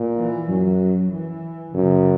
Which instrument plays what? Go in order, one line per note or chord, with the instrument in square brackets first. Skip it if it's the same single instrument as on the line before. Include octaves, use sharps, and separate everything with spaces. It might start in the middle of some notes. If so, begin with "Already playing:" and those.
Already playing: [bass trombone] A#2
[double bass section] E3
[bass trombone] F#2 [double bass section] F#3
[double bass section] E3
[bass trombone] F#2 [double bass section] C#3